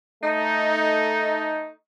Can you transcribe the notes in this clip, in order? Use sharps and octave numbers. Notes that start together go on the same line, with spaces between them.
A3 D#4